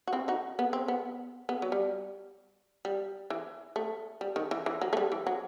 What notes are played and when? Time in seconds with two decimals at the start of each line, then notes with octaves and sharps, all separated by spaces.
0.07 F#4
0.13 C4 E4
0.28 D#4 F#4
0.59 B3
0.73 C4
0.88 B3
1.49 B3
1.62 F#3
1.72 G3
2.85 G3
3.30 E3
3.76 A3
4.21 G3
4.36 D#3
4.51 E3
4.66 E3
4.81 F#3
4.93 A3
4.97 G3
5.12 E3
5.27 F#3